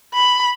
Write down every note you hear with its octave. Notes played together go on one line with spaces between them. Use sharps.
B5